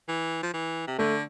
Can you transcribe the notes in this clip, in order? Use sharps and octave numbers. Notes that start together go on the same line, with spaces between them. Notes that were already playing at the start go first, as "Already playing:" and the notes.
E3
F3
E3
C3
D3 A3